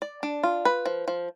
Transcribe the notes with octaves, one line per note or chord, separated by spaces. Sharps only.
D5
D4
F4
B4
F3
F3